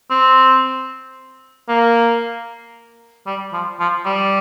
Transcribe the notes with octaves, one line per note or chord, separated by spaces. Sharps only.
C4
A#3
G3
F3
F3
G3